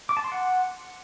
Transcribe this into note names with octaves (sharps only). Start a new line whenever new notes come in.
D6
A5
C6
F#5